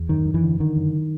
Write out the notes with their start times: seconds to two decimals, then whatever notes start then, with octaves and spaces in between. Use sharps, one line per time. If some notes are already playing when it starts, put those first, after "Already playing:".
Already playing: E2
0.09 F#2 D#3
0.25 F#2
0.34 E3
0.43 D3
0.60 D3 D#3
0.76 F#2